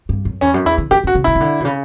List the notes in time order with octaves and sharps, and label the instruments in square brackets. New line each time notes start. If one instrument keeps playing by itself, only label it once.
[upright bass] G2
F#2
[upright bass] E2 [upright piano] C#4
[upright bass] F#2
[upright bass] E2 [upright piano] E4
[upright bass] D3
[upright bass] E3 [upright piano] G4
[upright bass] D3 [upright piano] F#4
[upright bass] C#3
[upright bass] D3 [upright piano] E4
[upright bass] C#3
D3
B2
C#3